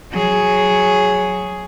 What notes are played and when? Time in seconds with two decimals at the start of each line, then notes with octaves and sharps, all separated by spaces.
0.11 F#3 G#4